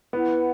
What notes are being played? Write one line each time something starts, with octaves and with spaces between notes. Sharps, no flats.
B3 E4 B4 F#5